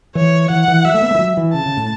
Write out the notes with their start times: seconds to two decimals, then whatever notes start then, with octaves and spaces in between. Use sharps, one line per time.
0.15 E3 C#5
0.50 E3 F#5
0.68 E3
0.85 F#3 E5
0.94 A3
1.02 B3
1.11 A3
1.15 E3
1.19 F#3
1.37 E3
1.53 C#3 A5
1.66 C#3
1.77 A2